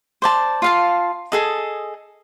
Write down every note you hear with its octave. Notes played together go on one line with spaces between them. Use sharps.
C5 D5 A5
F4 F5 A5
G#4 A4 D#5